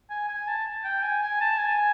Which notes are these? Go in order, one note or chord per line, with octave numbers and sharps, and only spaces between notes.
G#5
G#5
A5
G5
G#5
G#5
A5
G#5